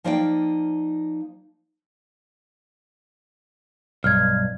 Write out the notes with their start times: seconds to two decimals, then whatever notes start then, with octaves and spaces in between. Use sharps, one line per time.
0.04 F3 A#3 D#4 D5 F5 G5
4.04 B1 G2 F6 G#6